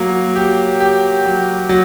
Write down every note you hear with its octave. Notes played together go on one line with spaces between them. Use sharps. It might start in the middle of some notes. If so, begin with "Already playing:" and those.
Already playing: F#3 A#3
G4
G4
F#3
F#3